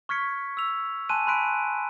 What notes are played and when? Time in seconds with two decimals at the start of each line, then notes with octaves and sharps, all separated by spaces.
0.09 C#6 F6 G#6 B6 C#7
0.57 E6 F7
1.09 G#5 A5 C6 F#6 D#7
1.27 A5 B5 C6 F#6 B6 D7